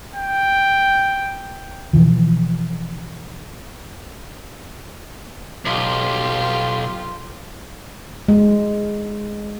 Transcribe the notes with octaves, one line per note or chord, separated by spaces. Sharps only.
G5
B2 E3 F3
B1 F4 G4
G#3